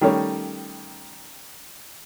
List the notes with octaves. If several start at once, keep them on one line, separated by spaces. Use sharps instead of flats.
D#3 G3 A3 C#4 C#5